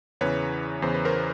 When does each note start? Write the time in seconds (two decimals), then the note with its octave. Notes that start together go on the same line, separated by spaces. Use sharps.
0.21 E2 C#3 E3 B4 C#5
0.82 E2 C#3 E3 C5
0.94 B4
1.05 A#4 C5